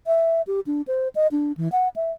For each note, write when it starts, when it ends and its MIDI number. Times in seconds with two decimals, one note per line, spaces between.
0.07 0.42 76
0.47 0.60 67
0.67 0.82 62
0.88 1.08 72
1.15 1.27 75
1.32 1.52 62
1.57 1.71 52
1.72 1.88 78
1.96 2.11 76